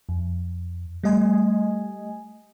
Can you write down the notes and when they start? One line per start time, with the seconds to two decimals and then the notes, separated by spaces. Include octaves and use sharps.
0.09 F2
1.04 G3 A3 D#5 G#5